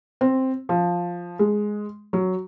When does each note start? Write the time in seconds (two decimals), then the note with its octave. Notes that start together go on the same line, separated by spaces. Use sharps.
0.21 C4
0.69 F3
1.39 G#3
2.13 F#3